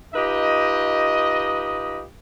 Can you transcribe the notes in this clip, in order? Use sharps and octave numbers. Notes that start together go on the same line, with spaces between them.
D#4 F4 G4 B4 D#5